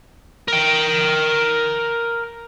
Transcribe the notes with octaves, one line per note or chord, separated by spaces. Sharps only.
A#4 G5